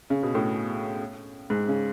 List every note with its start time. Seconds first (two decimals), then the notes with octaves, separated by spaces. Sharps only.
0.10 C#3
0.23 B2
0.35 A2
1.50 G#2
1.68 C#3